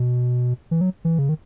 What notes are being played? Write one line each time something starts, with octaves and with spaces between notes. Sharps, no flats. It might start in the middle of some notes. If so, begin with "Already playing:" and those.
Already playing: B2
E3
F#3
E3
C#3
D#3